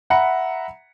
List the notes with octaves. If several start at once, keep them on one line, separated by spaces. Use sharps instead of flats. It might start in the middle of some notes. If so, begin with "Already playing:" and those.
E5 F#5 A#5 B5 C#7